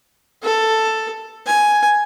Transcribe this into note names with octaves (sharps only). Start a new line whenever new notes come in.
A4
G#5